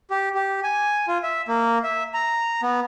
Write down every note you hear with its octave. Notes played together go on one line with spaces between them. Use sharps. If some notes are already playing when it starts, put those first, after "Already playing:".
G4
G4
G#5
F4
E5
A#3
E5
A#5
B3